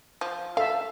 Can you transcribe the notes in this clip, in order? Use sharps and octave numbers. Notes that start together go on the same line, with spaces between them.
F3
A4 E5 F5 A5